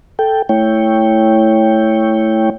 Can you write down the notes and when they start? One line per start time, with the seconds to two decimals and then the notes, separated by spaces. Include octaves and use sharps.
0.19 A4 G5
0.49 A3 E4 C#5 G5